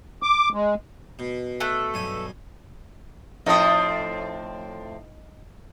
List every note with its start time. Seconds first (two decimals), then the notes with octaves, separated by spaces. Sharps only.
0.23 D6
0.53 G#3
1.19 B2
1.60 A3 A4 F#6
1.94 B1 G2 G#5
3.46 A2 F3 C4 D#4 D#6